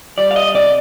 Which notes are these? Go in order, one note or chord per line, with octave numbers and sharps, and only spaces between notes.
G3 D5
F5
D#5
C3 D5